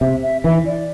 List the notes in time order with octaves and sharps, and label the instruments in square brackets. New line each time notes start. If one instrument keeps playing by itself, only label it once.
[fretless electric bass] C3 [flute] E5
[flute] E5
[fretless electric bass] E3 [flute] E5
[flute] D5